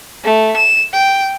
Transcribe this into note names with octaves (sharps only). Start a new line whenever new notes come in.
A3
E7
G5